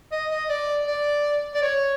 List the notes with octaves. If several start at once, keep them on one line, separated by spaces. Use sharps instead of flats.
D#5
D#5
D5
D5
D5
C#5